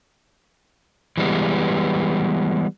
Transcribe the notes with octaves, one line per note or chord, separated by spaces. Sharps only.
E3 G3 G#3 B3